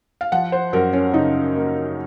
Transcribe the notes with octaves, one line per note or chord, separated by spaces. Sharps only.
F5
F3 F#5
C5
F#2 A#4
C#4
C#3 D#4
A#3